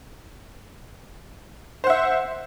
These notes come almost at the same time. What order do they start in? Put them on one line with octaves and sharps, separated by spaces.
C5 F#5 E5